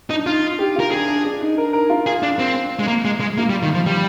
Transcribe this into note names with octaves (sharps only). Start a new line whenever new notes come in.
D4 D#4
D#4 F4
G4
F4 A#4
D4 G#4
D4
D4
D#4
A#4
A#4
F4
G#4
D4
C4
G#3
A#3
G#3
G#3
A#3 F4
G3
D#3
F3
G3